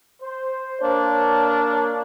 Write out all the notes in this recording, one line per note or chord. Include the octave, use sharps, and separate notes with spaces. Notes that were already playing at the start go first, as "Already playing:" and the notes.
C5
A#3 D4 C#5